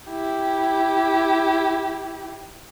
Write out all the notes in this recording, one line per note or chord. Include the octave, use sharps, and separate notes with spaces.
E4 G4